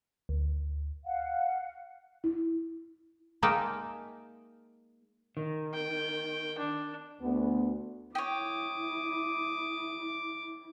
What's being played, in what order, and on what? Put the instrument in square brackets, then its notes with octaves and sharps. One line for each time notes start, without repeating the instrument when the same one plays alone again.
[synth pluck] D2
[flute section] F5 F#5
[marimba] E4
[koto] G#3 A#3 D#4 E5 G5 A5
[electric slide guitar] D#3
[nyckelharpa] G5
D4
[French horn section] D2 B3
[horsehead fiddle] E4 [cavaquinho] C#5 G5 [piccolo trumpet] D6 [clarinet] D#6